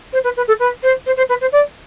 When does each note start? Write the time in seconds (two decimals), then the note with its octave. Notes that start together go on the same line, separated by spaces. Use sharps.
0.13 C5
0.24 B4
0.36 B4
0.47 A4
0.59 B4
0.82 C5
1.06 C5
1.17 C5
1.29 B4
1.40 C5
1.52 D5